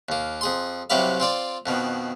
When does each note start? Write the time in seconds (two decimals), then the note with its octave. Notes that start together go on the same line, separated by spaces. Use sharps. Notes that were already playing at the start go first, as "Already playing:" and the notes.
0.09 D#2 A#3
0.41 F2 G#4 C6
0.90 C2 C3 F#3 G4 B4 F5
1.20 C4 F4 D5
1.66 F2 B2 D#3